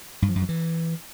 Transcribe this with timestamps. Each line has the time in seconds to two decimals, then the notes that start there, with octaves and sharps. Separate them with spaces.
0.22 G2
0.29 F3
0.35 F#2
0.42 F3
0.49 E3